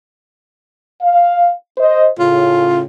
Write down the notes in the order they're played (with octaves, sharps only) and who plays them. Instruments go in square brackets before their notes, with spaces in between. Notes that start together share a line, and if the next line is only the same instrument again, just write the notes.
[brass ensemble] F5
C5 D#5
[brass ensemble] A2 C#3 [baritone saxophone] F4